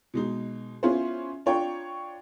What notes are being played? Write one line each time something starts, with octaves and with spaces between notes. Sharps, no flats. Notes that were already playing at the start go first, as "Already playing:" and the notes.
B2 G#3 D#4
B3 C#4 E4 F4 G#4 C5
D4 F4 C#5 G5 A#5